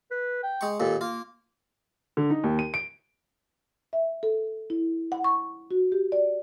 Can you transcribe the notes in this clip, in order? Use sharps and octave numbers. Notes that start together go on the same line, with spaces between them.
B4
G5
G#3 C#6
D#2 A#2 A4
A#3 F4
D3
D#4
D#2
D#7
D7
E5
A4
E4
F#5
C#6
F#4
G4
D5